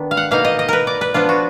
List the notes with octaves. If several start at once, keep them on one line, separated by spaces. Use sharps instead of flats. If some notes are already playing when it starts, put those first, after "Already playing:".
Already playing: D#3 B3 D4
F5
F#5
B2 A#3 D#4 F5
D#5
D#5
A#4 B4
D5
B4
F3 B3 D4 F4
F#4